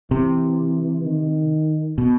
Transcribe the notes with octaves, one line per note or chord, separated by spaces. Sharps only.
C3 E3
D#3
B2